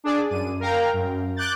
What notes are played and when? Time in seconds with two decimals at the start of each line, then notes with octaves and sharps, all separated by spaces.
0.04 D4 G#4 D5
0.30 F#2 D#7
0.60 A#4 F5 G5 A#5
0.93 F#2
1.36 D6 F#6 G6 A6